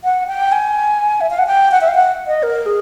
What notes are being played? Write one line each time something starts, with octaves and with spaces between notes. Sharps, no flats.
F#5
G5
G#5
E5
F5
F#5
G5
F#5
E5
F5
F#5
D#5
A#4
G#4